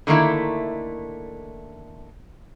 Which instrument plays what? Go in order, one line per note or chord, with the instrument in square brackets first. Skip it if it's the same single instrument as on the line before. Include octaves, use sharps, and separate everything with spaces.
[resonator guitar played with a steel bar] D3 D#3 A3 A#3 E4